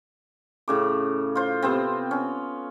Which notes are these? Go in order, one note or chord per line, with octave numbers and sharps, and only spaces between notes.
A2 C#3 D6
F4 C5
C3 B3 C4
C#4